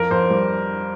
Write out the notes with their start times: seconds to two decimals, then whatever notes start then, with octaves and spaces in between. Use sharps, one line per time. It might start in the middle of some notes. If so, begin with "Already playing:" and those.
Already playing: F2 A#4
0.11 F2 C5
0.30 G3